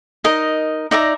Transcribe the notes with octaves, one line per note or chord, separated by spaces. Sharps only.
D#4 A#4 D#5
D#4 D5 E5 A#5